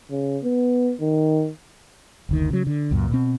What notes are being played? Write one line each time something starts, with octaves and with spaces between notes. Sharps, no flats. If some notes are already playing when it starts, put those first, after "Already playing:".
C#3
B3
D#3
F#1 D2 D#3
C#3 F#3
D3
C#2 F#2 A#2
B2 C4